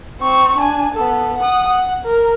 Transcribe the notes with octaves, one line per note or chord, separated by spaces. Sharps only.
C4 C#6
D4 G#5
B3 A4
F#5 D#6
F#5
A#4